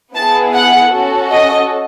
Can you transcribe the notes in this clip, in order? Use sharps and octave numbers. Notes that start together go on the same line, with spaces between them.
B3 E4 G#4 A5
F#5
C#4 F#4 A4
D#5